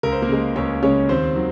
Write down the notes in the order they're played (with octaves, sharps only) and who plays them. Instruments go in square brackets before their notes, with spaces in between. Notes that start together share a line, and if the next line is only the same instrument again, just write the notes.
[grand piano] C#2 A#4
C5
A#3 A#4
C#3 G#3
C#2 C#4 C#5
C#3 G#3 C#4 C#5
D#2 C4 C5
D#3 F#3